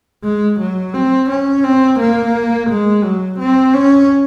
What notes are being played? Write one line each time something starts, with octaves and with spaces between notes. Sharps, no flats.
G#3
F#3
C4
C#4
C4
A#3
G#3
F#3
C4
C#4